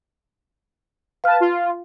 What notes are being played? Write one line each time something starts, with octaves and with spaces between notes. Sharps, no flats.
B4 F5 A5 F6
F4